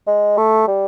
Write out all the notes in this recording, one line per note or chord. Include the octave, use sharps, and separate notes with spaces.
G#3
A3
G3